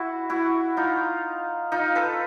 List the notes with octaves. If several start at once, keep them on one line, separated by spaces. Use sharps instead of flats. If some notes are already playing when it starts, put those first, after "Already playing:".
Already playing: E4 F#4
E4 F#4
D#4 F4
D#4 F4
A4 B4